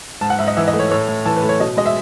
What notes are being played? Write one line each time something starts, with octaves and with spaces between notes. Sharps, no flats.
G#2 A5
F#5
G#2 E5
D#5
E3 E5
D#5
A3
C#5
A2 C#5
A2
E3 A5
B4
A3
C#5
B2 D#5
G#3 D#5
E5